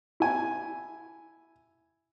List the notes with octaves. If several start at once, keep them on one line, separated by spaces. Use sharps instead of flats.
E4 G#5